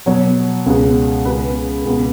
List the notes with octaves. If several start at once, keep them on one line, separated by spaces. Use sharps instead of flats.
B2 F#3 B3 C#5
C#2 B2 G#3 B3
C#2 C#3 G#3 B3 B4
C#2 B2 B3